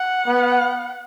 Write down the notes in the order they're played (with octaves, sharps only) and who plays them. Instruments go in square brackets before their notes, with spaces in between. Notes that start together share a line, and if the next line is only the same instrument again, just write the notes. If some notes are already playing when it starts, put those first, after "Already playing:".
Already playing: [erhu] F#5
[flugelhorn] B3